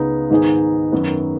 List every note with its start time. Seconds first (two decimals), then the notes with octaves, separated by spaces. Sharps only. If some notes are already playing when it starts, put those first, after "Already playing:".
Already playing: C#2 C#3 B3 D#4 B4
0.30 G#2 D#3 B3 D#4 G#4
0.92 F#2 D#3 B3